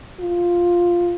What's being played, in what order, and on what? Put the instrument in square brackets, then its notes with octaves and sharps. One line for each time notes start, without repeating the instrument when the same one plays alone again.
[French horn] F4